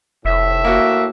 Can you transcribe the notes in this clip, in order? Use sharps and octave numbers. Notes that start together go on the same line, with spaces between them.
F1 A2 E5
A#3 F#4